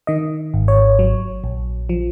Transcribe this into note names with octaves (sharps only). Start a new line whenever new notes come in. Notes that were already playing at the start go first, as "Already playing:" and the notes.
D#3 D#5
G#1
C#5
F#3
A#1
F3